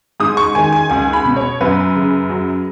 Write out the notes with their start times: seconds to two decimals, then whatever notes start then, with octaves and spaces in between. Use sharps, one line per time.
0.20 G#2 D#6
0.37 C#6
0.55 D#3 G#5
0.72 G#5
0.90 C#2 G#5
1.13 B5
1.25 B2
1.36 C#5
1.61 F#2 B4
1.96 C#3
2.30 F#3